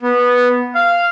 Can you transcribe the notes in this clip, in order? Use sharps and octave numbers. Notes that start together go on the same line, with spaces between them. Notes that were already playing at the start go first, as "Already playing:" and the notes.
B3
F5